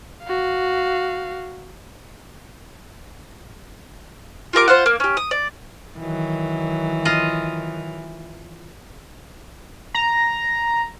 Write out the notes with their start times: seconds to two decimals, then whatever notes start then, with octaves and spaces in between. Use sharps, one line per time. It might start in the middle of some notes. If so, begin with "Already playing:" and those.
0.24 F#4 F5
4.53 F4 G4 A#4 D6
4.68 F4 C5 F5 F#5
4.86 A#3
5.00 C#4 G4
5.17 D#6
5.31 D5
5.99 D#3 E3 F#3
7.05 F4 D#5
9.94 A#5